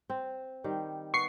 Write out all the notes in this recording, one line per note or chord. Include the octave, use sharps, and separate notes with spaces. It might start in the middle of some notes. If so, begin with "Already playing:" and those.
C4
D#3 G3
B3 C#6 C7